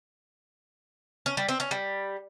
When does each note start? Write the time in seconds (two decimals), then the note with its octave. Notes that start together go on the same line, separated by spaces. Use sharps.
1.26 C#4
1.37 G3
1.48 C4
1.60 C#4
1.71 G3